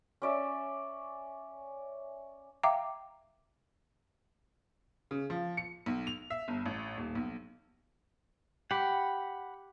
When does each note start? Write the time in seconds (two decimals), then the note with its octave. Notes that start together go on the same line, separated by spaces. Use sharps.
0.22 C#4 D5 E5
2.63 E5 F5 G5 A#5 D6
5.11 C#3
5.30 F3
5.57 C#7
5.86 B1
6.07 F7
6.30 E5
6.48 G1
6.66 A1
6.97 D#1
7.15 B1
8.71 G4 F#5 B5